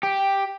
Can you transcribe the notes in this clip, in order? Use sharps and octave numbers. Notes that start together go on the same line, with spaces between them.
G4